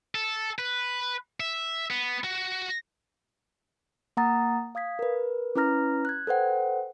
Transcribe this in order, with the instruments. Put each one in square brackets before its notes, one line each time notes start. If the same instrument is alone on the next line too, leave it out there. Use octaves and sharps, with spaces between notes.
[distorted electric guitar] A4
B4
E5
B3
F#4
[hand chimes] A#3 F#5 A#5 D#6 A6
F5 D#6 G#6 B6
A#4 B4
C#4 E4 B4 A#5 F6 A#6
F#6 G#6
A4 B4 C5 F#5 G5